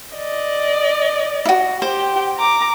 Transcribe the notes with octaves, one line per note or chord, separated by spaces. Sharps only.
D5 D#5
E4 F#4
G4 C5 G5
A#5 D6